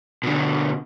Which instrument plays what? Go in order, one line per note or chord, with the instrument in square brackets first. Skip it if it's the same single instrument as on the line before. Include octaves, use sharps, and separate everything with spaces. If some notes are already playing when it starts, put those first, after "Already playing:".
[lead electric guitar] B2 D3